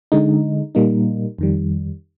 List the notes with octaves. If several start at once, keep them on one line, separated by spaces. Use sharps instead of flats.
D3 G#3 D#4
A#2 G3 A#3 D#4
F2 D#3 G3